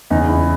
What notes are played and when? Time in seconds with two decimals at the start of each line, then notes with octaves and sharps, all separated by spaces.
0.10 E2 C#3 E3 D#4
0.29 E4